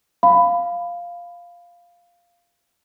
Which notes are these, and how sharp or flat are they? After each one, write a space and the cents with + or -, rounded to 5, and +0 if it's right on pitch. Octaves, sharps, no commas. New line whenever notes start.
F5 +0 B5 +15